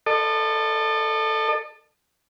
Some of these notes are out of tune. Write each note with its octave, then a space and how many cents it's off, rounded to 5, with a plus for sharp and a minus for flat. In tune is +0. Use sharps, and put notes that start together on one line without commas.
A4 +10 D#5 -40